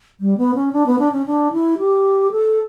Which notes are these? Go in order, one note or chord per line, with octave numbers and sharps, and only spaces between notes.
G3
B3
C#4
D4
B3
D4
C#4
D4
E4
G4
A4